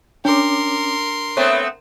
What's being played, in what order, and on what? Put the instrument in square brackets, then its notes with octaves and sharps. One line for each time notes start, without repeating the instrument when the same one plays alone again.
[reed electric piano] C#4 D6 [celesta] D4 [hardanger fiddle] A#4 C6
[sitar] A3 B3 C4 [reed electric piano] C#5